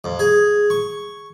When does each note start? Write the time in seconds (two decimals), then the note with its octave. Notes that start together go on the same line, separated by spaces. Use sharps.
0.04 F2
0.19 G#4
0.70 C#6